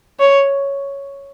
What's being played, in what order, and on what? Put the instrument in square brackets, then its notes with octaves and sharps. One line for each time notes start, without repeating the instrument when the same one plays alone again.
[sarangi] C#5